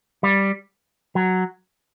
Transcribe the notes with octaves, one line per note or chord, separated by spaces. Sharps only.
G3
F#3